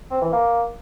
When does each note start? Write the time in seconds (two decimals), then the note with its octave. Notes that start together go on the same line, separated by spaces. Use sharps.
0.11 C4
0.21 E3
0.32 A#3